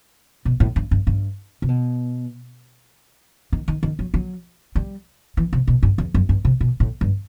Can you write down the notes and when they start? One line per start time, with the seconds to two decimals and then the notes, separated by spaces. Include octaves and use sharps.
0.45 B2
0.60 A2
0.76 G2
0.91 G2
1.07 G2
1.62 C3
1.69 B2
3.52 D#3
3.68 D#3
3.83 D#3
3.99 F#3
4.14 F#3
4.75 G3
5.37 E3
5.53 C3
5.67 B2
5.83 G2
5.98 E2
6.14 F#2
6.29 G2
6.45 C3
6.61 B2
6.80 A2
7.01 G2